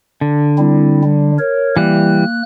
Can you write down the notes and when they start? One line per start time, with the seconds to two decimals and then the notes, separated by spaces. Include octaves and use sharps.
0.21 D3
0.58 G3 C4 E4
1.03 G3
1.39 A#4 C#5
1.77 E3 G3 A#3 F#6